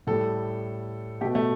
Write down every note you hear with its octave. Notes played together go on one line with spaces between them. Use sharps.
A2 G3 A4
B2 A3 G4
A3